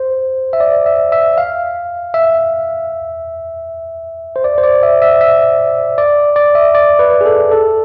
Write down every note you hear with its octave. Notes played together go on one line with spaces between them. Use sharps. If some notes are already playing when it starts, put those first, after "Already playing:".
Already playing: C5
E5
D5
E5
E5
F5
E5
C5
D5
C5
D5
E5
E5
E5
D5
D5
E5
D5
B4
G#4
A4
A4